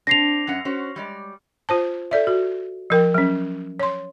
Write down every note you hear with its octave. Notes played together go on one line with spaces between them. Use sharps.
C4 D4 A#6 C7 F7
F#2 C#4 F#5
C#4 F#4 C5
G3 G#3 D5
F4 C5 A5
A4 D5 E5
F#4
F3 A#4 G5
F#3 C#4
C#5 C6